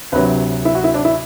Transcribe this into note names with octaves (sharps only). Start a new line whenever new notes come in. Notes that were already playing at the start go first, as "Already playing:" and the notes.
D2 C3 F#3 B4
E4
F#4
E4
D4
E4